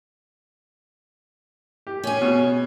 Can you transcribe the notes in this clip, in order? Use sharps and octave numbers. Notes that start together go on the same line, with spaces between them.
G4
C#4 G#4
B2